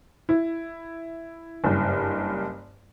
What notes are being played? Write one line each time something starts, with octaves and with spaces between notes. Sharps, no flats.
E4
F#1 G2